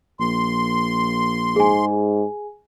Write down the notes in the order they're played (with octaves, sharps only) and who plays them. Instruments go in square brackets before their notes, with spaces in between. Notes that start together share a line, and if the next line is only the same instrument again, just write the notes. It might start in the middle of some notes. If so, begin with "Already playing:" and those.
[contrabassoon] A#1 [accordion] C6
[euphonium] G#2 [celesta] G#4 G#5